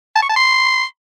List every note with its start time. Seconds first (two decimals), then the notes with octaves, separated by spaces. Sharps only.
0.15 A5
0.22 C#6
0.29 A5
0.36 C6